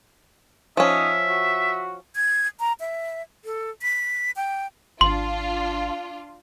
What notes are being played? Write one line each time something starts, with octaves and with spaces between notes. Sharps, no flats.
F3 C#4 D#4 E5
F#4
G#6
A#5
E5
A4
B6
G5
G#1 D4 F4 C6